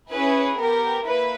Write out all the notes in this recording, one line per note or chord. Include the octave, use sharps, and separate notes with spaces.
C#4 E4 G#4 B4
B3 G4 A#4
A#3 E4 B4